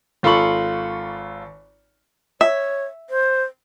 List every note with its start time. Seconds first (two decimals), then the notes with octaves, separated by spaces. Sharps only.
0.23 G#1 F4 A4 B5 C#6 F#7
2.41 C#5 E5
3.10 C5